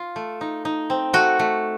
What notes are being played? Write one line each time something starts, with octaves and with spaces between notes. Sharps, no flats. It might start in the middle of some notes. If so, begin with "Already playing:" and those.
Already playing: F4
A3
D#4
D#4
C4
A3 F#4
A3